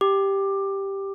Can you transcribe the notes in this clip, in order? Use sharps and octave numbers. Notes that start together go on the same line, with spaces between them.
G4